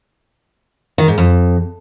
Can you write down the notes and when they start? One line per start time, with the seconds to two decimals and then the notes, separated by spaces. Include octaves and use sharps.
0.98 D#3
1.08 G#2
1.18 F2